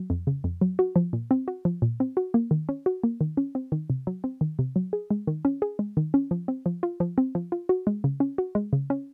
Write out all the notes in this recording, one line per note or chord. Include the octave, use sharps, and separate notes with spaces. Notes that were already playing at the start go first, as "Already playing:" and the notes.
Already playing: F#3
F2
C#3
F2
F#3
F#4
F3
A#2
C4
F#4
F3
A#2
C4
F#4
A#3
D#3
C#4
F#4
A#3
D#3
C#4
C4
D#3
C3
F#3
C4
D#3
C3
F#3
G#4
G#3
D#3
C#4
G#4
G#3
D#3
C#4
F3
C4
F3
F4
F3
C4
F3
F4
F#4
G#3
C#3
C#4
F#4
G#3
C#3
C#4